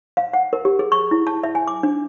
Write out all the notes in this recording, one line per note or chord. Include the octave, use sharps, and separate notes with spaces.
F5
F#5
A#4
G4
G#4
C#6
E4
A5
E5
G#5
D6
D4